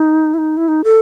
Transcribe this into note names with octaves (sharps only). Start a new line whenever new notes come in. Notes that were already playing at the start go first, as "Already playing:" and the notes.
Already playing: D#4
E4
D#4
E4
D#4
A4